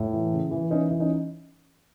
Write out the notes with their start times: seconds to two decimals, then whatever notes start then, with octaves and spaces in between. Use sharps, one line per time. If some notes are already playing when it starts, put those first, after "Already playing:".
Already playing: A2
0.13 E3
0.32 C#3
0.51 E3
0.70 E3 C#4 D#4
0.90 E3
1.00 C#4 D#4